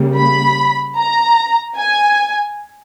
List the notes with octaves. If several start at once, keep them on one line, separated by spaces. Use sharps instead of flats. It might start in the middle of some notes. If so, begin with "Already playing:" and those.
Already playing: C#3 G3 A#3
B5
A#5
G#5